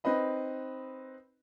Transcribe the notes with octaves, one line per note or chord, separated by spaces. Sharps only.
C4 D#4 B4 D#5 B5